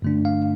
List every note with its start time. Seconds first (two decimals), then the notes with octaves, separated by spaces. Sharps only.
0.02 G2 D3 A3 D4
0.25 F5